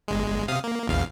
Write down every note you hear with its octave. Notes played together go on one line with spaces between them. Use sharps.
G1 G#3
C3 F5 D#6
A#3
A#1 E2 F5